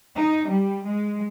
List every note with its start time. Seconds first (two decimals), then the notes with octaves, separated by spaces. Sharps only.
0.16 D#4
0.48 G3
0.85 G#3